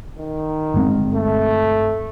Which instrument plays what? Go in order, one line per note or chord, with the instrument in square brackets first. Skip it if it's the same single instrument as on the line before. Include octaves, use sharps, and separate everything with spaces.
[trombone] D#3
[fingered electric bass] G1 G#3 C4
[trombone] A3